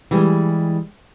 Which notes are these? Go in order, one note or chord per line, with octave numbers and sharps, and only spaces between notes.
E3 G3 G#3